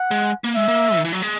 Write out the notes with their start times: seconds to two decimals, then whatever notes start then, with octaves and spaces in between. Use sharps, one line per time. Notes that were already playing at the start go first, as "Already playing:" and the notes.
Already playing: F#5
0.11 G#3
0.44 A#3
0.55 G#3 E5
0.68 A#3
0.96 D#3
1.05 E3
1.13 F#3
1.22 G#3